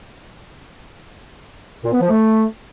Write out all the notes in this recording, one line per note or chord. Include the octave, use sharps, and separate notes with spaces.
A#2
B3
F3
A3